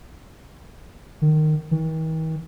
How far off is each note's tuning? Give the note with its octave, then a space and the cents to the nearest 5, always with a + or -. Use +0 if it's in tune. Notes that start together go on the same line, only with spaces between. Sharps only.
D#3 -15
D#3 +45